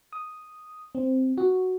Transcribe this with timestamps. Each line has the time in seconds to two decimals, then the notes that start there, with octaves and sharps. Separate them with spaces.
0.13 D#6
0.95 C4
1.38 F#4